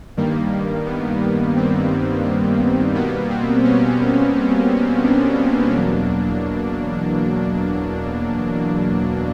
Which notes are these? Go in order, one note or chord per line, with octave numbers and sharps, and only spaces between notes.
G2 D#3 G3 A#3
B3
C4
B2 G3 A#3 B3
C4
C#4
D4
E2 B2 F#3 A#3